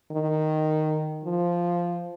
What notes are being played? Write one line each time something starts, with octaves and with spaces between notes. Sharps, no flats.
D#3
F3